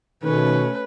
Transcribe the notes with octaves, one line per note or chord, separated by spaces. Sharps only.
B2 D#3 A3 C#4 B4